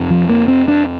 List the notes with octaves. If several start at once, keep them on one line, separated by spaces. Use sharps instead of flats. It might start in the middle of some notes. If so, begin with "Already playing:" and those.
Already playing: F2 C3
F3
A#3
C4
D4